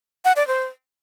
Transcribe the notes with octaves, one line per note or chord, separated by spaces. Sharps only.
F#5
D5
C5